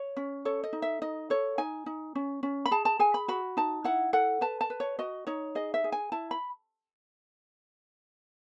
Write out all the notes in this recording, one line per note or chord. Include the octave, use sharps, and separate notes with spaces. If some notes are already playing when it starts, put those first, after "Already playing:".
Already playing: C#5
C#4
A4 C#5
D#5
D#4
E5
D#4 D#5
A4 C#5
D#4 G#5
D#4
C#4
C#4
B5
G#4 A5
A5
G#4 G#5
B5
F#4 B5
D#4 A5
E4 F#5
A4 F#5
B4 A5
A5
B4
C#5
F#4 D#5
D#4 C#5
G#4 D#5
E5
G#4
G#5
E4 A5
B5